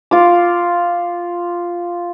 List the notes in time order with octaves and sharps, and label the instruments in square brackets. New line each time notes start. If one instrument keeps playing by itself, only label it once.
[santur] F4 D6